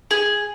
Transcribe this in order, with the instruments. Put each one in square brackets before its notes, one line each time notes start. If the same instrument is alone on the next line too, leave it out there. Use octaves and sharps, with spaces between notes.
[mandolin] G#4